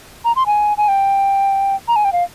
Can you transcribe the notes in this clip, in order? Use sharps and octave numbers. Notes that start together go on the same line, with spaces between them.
A#5
C6
G#5
G#5
G5
A#5
G#5
G5
F5